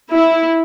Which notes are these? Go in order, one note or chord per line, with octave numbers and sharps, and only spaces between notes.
E4